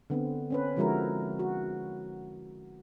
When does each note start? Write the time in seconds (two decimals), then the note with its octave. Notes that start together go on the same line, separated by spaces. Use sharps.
0.10 D3 B3 C4
0.50 C4 C#4 B4
0.76 D3 F3 G#3 E4 F#4 A#4
1.39 F#4